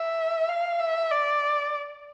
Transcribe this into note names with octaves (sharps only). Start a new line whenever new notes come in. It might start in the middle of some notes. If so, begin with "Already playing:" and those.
Already playing: E5
F5
E5
D5